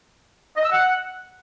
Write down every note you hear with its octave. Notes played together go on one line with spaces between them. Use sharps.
D#5
E6
F#5